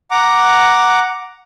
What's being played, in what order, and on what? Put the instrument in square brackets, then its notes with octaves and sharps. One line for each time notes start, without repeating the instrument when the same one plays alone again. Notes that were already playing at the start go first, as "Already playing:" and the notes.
[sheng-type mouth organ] F#5 A#5 D6